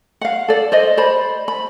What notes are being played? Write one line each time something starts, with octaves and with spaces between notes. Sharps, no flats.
F5 F#5
A4 D5
C5 D5 D#5
C5 D5 B5
B5